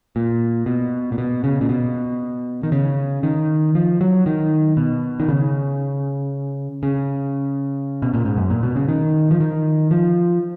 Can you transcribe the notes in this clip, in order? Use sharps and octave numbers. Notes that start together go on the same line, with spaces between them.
A#2
B2
A#2
B2
C#3
A#2
B2
D#3
C#3
D#3
F3
F#3
D#3
B2
D#3
C#3
C#3
B2
A#2
G#2
F#2
A#2
B2
C#3
D#3
F3
D#3
F3